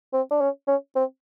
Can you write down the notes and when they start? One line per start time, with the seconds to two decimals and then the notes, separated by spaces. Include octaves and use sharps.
0.13 C4
0.31 D4
0.41 C#4
0.67 C#4
0.96 C4